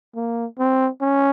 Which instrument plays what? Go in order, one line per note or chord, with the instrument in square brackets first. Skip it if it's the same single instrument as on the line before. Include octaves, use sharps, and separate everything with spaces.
[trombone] A#3
C4
C#4